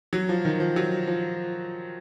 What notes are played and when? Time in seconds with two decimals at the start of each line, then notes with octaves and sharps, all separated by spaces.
0.13 F#3
0.29 F3
0.45 D#3
0.60 F3
0.76 F#3
1.07 F3